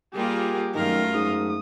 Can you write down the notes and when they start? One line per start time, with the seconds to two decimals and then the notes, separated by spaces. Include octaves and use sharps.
0.14 G3 A#3 F4 G4 G#4 A#4
0.75 F#2 D#3 A3 F4 A#4
1.14 G#2 D#6